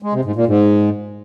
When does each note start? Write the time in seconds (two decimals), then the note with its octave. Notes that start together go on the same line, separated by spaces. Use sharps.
0.02 G#3
0.13 C3
0.24 G#2
0.35 A#2
0.46 G#2